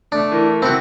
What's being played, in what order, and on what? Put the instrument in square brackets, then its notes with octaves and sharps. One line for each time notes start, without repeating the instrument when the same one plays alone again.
[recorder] A3 [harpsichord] D4
[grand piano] E3 [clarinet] A#4
[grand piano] E3 E4 [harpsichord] C4 F#4